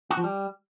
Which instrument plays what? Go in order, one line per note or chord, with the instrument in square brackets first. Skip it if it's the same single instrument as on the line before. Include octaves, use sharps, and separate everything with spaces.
[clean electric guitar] F#4
F3
G3